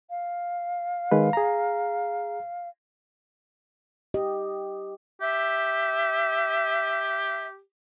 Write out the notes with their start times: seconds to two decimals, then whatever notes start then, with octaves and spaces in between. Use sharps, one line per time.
0.10 F5
1.11 D#3 G#3 B4
1.33 G#4 A#5
4.14 G4 D#5
5.21 G4 E5